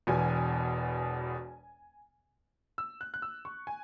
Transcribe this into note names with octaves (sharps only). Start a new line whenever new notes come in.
E1 E2 B2 G#5
E6
F#6
F#6
E6
C#6
G#5